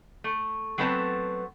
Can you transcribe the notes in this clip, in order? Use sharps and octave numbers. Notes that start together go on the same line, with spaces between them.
A3
F#3 A3 B3 C4 D4 A5